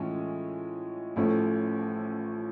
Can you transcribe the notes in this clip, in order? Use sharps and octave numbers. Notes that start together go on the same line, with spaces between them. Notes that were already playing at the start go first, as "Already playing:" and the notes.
Already playing: A2 E3 G#3 C#4 F4
A1 A2 F3 A3 C#4